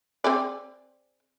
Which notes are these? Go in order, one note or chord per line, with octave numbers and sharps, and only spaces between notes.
C4 G#4 D5